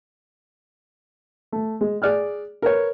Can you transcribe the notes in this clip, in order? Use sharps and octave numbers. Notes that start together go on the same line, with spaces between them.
A3
G#3
G#4 D5 F6 F#6
A#4 B4 C#5